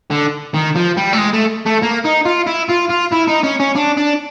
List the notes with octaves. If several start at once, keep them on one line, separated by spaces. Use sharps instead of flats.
D3
D#3
F3
G3
A3
G#3
A3
A3
A#3
D#4
F4
E4
F4
F4
E4
D#4
C#4
C#4
D4
D4